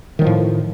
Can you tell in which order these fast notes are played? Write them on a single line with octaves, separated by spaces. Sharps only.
D#3 F#3 F3 A2